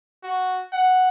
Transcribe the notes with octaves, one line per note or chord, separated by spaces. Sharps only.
F#4
F#5